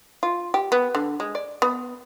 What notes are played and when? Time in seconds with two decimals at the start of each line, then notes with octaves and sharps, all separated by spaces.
0.23 F4
0.54 G4
0.72 B3
0.95 D3
1.20 G#3
1.35 D5
1.62 B3